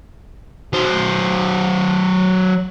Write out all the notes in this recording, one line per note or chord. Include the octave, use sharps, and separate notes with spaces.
F#3 C5